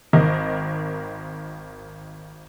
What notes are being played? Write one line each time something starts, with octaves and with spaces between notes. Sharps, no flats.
G#1 D#3 D#5